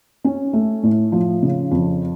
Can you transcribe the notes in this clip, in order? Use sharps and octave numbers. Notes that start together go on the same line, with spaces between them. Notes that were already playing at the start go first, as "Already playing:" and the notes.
C#4
A3
A2
F3
C#3
F2